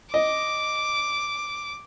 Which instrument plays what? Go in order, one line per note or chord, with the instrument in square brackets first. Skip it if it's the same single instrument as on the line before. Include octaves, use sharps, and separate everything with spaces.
[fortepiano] D#5 [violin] D6